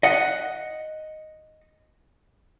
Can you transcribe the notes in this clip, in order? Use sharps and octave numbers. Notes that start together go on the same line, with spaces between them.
D#5 F#5